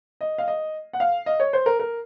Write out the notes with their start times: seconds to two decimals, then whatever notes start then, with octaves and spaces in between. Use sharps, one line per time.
0.21 D#5
0.38 F5
0.48 D#5
0.93 F#5
1.00 F5
1.26 D#5
1.40 C#5
1.53 C5
1.66 A#4
1.79 A#4